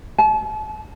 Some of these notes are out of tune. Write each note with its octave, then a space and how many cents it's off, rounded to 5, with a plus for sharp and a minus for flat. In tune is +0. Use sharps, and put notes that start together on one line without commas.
A5 -40